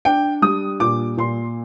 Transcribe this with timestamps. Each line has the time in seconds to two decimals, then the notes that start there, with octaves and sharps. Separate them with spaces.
0.05 D4 G5
0.42 G3 D#6
0.80 A#2 D6
1.17 A#2 C6